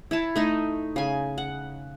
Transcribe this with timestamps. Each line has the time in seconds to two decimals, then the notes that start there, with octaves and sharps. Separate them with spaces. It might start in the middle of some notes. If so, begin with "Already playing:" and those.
0.11 E4 C#5 A5
0.36 A3 D#4
0.96 C#3 G#5
1.38 F#5